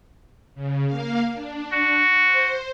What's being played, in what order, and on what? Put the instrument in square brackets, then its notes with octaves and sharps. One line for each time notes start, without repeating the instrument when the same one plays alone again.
[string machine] C#3
A#3 F5
D4
[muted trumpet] F#4
[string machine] C5